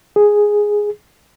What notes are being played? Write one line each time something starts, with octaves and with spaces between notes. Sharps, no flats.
G#4